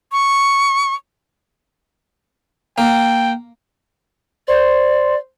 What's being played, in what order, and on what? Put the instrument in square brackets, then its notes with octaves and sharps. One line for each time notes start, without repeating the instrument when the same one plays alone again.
[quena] C#6
[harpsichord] A#3 [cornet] G5
[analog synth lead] C5 [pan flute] D5